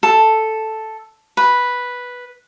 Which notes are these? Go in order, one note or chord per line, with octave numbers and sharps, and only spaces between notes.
A4
B4